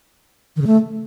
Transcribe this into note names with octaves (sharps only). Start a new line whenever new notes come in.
D#3
C#3
A3